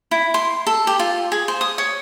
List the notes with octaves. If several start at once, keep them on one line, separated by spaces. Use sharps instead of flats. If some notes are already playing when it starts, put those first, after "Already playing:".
E4
C6
A4
G4
F4
G#4
C5
D#6
C#5